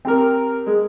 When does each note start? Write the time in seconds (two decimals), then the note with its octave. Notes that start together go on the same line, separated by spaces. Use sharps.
0.05 C4 G4 A#4
0.67 G#3